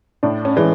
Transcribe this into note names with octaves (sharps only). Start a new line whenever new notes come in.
A2 D4
C#4
E3 G#3 C#4